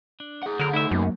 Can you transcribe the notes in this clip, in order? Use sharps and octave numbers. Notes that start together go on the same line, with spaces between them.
D4
G#4 F#5
D3 F#3 A#4
A3 D#4 E4 E5
F#2 C#3 F#3 A#3